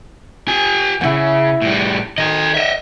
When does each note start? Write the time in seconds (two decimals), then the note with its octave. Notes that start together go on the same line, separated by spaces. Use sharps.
0.48 G4 G#5
1.01 E2 C#3 E4 F#5
1.62 A2 G3
2.18 D#3 A4 D#5
2.54 D#5 E5